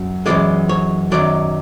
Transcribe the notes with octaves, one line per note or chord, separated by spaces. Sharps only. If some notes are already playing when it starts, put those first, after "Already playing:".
Already playing: F#2
F#2 C#3 E3 G#3 D5
C#5
F#2 D#3 F#3 D5